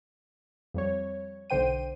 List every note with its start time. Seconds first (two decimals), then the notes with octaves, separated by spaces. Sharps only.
0.74 F2 G3 C#5
1.50 B1 D3 C5 G5 D#7